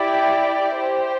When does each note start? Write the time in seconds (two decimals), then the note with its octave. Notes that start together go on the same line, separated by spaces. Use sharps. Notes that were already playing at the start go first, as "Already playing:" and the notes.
Already playing: E4 G4 D5 G5
0.79 G4 C5 G5